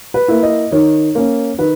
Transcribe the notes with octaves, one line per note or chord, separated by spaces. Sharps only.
B4
A#3 E4
D#5
D#3 C#5
A#3 C#4
D#3 B4